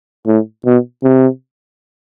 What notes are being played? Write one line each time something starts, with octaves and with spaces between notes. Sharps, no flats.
A2
B2
C3